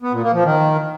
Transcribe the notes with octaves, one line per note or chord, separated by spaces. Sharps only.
B3
A#2
A#3
F3
D#3